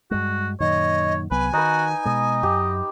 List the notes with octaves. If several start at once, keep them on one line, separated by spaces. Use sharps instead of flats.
G2 G#3 F#4
F#2 A#2 D#3 C#5 D#5
C2 F#3 B3 B4 G#5
D#3 D#4 F#4 B4
B2 G#3 D#5
F#2 G4